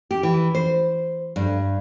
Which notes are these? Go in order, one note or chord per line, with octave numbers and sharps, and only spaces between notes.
G4
E3
C5
G2